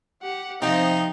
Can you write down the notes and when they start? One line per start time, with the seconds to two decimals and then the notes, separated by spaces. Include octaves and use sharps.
0.22 G4 F#5
0.62 C3 F3 C4 D#4 D#5